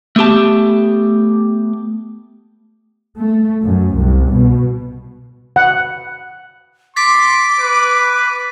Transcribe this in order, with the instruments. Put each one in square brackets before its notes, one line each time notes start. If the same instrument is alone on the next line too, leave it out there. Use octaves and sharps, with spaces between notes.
[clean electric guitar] A3 B3 G4 A5
[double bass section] A3
F#2
C2
B2
[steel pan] F#5
[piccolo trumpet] C6 [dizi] D6 [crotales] A6 B6
[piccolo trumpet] B4